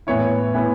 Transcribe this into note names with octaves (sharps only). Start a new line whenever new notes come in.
A2 E3 B3 E4 C#5
A2 E3 B3 E4